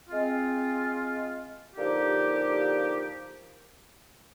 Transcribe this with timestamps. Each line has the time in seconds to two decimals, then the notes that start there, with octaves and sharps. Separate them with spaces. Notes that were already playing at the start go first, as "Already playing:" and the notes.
0.09 G#3 C4 F4
1.75 D3 F3 A#3 D#4 G4